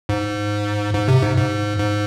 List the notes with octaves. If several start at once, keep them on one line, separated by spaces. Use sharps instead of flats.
G#2
G#2
C3
G#2
G#2
G#2